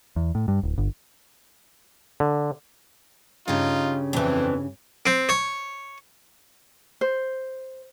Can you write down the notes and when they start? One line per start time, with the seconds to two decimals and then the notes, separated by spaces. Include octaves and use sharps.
0.16 E2
0.35 A2
0.48 G2
0.63 D1
0.78 G1
2.20 D3
3.48 G2 C#3 D#4 F4
4.13 F2 E3 C4 D4
5.06 C4
5.29 C#5
7.01 C5